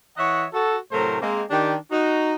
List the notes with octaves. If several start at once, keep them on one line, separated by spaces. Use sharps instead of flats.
E3 C#5 D#5 E5 F#5
F#4 A4
A2 C3 F#3 A3 A#4 C5
G#3 A#3 C4
D#3 D4 G4
D#4 F#4